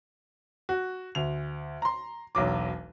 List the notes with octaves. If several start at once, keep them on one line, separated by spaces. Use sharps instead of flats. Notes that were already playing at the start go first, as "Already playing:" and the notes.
F#4
D2 F7
A#5 C6
E1 B1 F#3 D6